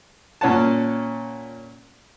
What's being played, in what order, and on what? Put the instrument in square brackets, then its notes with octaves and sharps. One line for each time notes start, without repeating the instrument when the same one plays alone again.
[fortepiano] A#2 C#4 F#5 A5